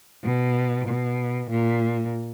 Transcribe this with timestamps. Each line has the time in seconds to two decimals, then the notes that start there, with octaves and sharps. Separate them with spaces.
0.24 B2
0.88 B2
1.51 A#2